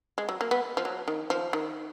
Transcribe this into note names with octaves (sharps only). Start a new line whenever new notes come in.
G#3
F#3
A#3
B3
F3
F#3
D#3
F3
D#3